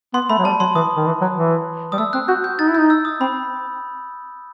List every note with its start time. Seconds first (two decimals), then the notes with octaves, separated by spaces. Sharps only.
0.14 B3 C6
0.29 A3 B5
0.38 F#3
0.45 G3 A5
0.60 F#3 C6
0.75 E3 D#6
0.96 D#3
1.06 E3
1.21 F#3
1.36 E3
1.92 G3 D#6
1.98 A3 E6
2.13 C4 F#6
2.28 F#4 G6
2.44 G6
2.59 D#4 A6
2.69 E4
2.75 G6
2.80 D#4
2.90 E6
3.05 D#6
3.20 C4 B5